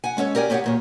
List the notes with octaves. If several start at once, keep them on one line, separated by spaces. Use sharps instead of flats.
F#5 G#5
G#3 C#4 A4 C#5
G4 A#4 D5 F5 G#5
B3 G4 C#5 D#5 F5 F#5
E2 A#2 C#5